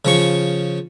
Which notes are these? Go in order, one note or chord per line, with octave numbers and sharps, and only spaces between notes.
C#3 F3 C#6